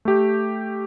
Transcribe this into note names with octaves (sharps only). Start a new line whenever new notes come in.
A3 G4